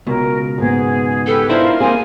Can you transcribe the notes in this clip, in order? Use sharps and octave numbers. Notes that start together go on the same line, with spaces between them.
C#2 B2 A#4
G#2 B3 G#4
G4 A4 B4
D4 E4 F4 A#4 C5 C6
A#3 C4 G#4 G#5